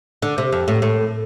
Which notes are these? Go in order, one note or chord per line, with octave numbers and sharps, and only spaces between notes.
D3
C3
F2
A2
A2